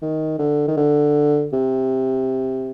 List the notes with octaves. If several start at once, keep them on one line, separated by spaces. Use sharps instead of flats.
D#3
D3
D#3
D3
C3